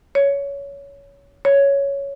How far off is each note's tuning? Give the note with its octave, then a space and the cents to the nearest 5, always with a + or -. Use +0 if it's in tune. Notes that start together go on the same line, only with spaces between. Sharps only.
C#5 +20
C#5 +5